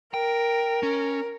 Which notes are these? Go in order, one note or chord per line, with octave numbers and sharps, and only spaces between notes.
A#4 G5
C#4